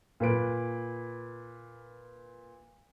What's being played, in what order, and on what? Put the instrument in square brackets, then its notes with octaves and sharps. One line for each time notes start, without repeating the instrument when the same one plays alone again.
[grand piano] A#2 B4 D7